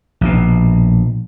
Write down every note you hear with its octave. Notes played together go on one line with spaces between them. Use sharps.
A#1 B2